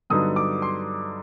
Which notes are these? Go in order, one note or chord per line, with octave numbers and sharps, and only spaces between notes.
G2 D3 F#3 B3 D#4 D#6
D6
C6